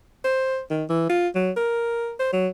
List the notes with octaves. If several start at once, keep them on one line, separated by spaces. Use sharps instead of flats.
C5
D#3
E3
F4
F#3
A#4
C5
F#3